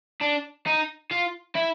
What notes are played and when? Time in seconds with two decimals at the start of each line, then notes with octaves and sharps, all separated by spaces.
0.21 D4
0.66 D#4
1.11 F4
1.55 E4